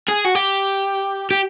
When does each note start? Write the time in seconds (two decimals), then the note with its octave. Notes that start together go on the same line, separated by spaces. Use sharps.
0.09 G#4
0.25 F#4
0.35 G4
1.31 G4